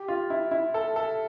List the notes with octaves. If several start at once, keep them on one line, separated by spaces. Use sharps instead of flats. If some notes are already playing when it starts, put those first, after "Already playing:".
Already playing: G4
F4
E4
E4
A4
A4